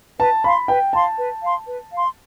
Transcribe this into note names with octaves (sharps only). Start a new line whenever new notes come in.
B4 A5
F5 B5 C6
B4 G5
F5 A5 C6
B4
F5 C6
B4
F5 C6